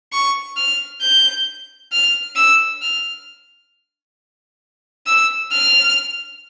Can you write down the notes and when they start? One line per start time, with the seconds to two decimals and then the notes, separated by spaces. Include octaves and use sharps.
0.12 C#6
0.57 F6
1.01 G6
1.92 F6
2.36 E6
2.82 F6
5.07 E6
5.52 F6